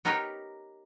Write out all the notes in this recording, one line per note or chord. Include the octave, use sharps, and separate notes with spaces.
B3 D#4 G4 A#4 B4 C#5